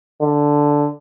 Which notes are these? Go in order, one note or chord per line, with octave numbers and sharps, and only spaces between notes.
D3